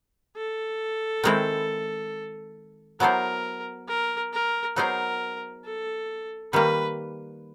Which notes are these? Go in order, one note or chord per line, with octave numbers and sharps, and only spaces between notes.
A4
D#3 G#3 C4 E4
F#3 B3 E4 A4 A#4 C5
A#4
A#4
F#3 B3 D#4 G#4 A#4 C5
A4
D#3 G3 A#3 B4